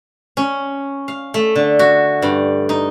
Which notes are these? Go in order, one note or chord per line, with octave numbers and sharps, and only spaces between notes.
C#4
F5
A3
D3
F#4
G2
D#4